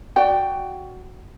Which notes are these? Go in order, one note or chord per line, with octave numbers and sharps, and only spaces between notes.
F#4 D5 G5